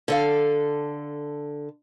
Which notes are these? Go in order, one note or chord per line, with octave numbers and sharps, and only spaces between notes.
D3 A4 F5